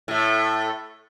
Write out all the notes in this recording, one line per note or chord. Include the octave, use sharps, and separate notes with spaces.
A2 A3